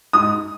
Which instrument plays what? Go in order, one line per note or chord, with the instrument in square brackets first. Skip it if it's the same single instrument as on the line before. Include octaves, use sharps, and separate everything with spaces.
[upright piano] G#2 D#6